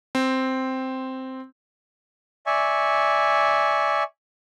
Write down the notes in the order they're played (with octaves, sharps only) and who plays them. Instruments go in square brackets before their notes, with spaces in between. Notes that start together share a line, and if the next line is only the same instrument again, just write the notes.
[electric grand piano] C4
[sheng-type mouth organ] D5 E5 G#5 C#6